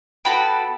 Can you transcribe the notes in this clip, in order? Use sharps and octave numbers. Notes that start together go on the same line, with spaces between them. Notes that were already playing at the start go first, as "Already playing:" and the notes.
B3 F#4 A4 G5 B5